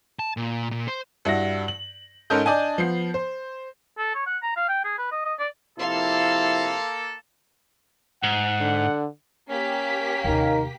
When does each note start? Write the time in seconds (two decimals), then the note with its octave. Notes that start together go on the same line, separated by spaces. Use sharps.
0.19 A5
0.37 A#2
0.71 A#2
0.88 C5
1.25 G2 E4 F#4 A#6
1.68 F#7
2.30 G#2 C#4 A4 A#4 D#5 G6
2.45 D4 D5 D#5 G#5 A5
2.78 F3 B3 C7
3.14 C5
3.98 A4
4.15 C#5
4.27 F#5
4.43 A#5
4.56 F5
4.69 G5
4.84 G#4
4.99 B4
5.12 D#5
5.25 D#5
5.39 D5
5.79 C3 F3 A#3 E4 A4 F5 C6
8.23 G#2 F#5
8.60 D3
9.49 A#3 C#4 G4 B6
10.24 D#2 C3 D#4 A#4 F5